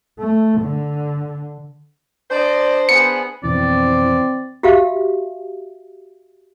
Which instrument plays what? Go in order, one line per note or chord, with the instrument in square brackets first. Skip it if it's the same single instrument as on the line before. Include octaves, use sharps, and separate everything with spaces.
[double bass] A3
D3
[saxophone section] D4 C5 [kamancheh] D5 D#5
[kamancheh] B3 G#4 [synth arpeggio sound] C#7
[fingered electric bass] F2 B2 D3 [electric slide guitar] E3 [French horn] C4 [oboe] D5
[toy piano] F#4 G4 E5 F5